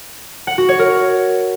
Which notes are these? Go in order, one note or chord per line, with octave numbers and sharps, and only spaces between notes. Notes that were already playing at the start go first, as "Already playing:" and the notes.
F#5
F#4
C#5
A#4